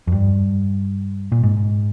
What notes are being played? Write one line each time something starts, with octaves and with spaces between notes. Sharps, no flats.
F2
G2
A#2
G#2